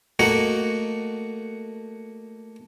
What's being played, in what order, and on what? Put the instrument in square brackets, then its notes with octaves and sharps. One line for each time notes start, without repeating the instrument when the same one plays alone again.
[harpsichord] A3 A#3 F#4 D#5 F#5